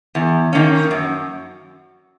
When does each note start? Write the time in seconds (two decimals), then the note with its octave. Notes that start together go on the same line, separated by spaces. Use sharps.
0.15 E2
0.53 D#3 A#3 C#4
0.91 F#2